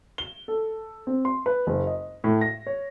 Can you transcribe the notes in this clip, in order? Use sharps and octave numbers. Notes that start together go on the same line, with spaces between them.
G7
A4
C4
C6
B4
F#1
D#5
A2
A#6
C#5